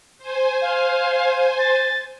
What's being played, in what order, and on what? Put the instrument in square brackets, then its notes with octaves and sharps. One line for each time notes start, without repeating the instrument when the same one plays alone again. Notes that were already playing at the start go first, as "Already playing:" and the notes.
[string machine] C5 G#5
[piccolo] F5
A6